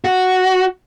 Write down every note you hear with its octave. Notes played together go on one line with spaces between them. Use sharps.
F#4